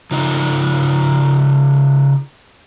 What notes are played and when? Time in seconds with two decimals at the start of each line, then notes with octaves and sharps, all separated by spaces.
0.11 C#3 D#4 F4 D#5